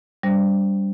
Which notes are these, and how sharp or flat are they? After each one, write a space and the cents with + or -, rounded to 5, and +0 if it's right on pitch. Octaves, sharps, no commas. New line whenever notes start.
G3 +0 D4 -25 C5 -10